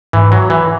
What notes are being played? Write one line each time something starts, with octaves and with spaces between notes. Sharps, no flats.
G#2 E3
F#3
E3